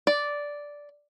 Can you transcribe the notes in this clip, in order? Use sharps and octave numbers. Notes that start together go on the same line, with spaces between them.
D5